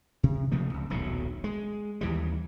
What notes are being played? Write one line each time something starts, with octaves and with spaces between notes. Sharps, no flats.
C3
C3 F3 A3 A#3
C#2
D#1 B1 A2 F#3
G#3
D#2 E3 G3